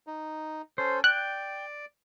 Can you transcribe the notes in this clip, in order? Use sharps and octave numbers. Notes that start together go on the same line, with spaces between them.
D#4
C#4 A4 C5 C#5
D5 G5 F#6